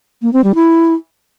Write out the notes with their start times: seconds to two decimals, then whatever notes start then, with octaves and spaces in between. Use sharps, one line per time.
0.22 A#3
0.33 C4
0.44 G3
0.55 E4